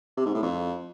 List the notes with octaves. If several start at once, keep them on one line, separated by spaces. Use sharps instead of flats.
C3
G#2
A2
F2